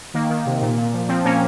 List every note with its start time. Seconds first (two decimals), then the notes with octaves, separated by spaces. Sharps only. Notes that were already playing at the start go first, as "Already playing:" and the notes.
0.14 D#3 A#3
0.30 D#3
0.46 C3
0.62 A#2
0.78 A#2
0.93 F3
1.09 F3 C4
1.25 A#2 A#3 C#4